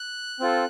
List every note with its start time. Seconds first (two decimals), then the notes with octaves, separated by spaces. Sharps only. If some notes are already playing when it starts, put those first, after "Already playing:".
Already playing: F#6
0.40 C4 F4 A4